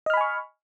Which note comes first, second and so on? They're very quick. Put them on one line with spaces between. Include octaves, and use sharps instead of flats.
D#5 F6 B5 G#5 C#6